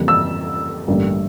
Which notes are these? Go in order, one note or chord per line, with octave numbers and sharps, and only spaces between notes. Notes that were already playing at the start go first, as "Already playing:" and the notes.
Already playing: F2 C#3 E3 G3 A#3
E6
A1 G2 D3 G3 A#3